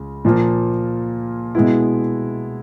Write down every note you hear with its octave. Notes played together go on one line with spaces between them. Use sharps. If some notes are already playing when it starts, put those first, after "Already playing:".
Already playing: C#2 C#3
A#2 F3 A#3
B2 G#3 B3 E4